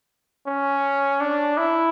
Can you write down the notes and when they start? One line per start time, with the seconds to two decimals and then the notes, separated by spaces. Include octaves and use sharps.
0.46 C#4
1.20 D4
1.57 E4